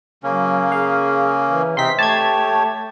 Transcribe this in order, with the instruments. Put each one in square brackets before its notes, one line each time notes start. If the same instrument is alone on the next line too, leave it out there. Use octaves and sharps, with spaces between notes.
[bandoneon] C#3 A#3 C#4 [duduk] F#3
[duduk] G#4 [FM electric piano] F5
[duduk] E3
[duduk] C3 [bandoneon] C4 D#4 [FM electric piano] C6 B6
[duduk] A3 [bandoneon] G4 C#5 [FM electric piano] A5 G#6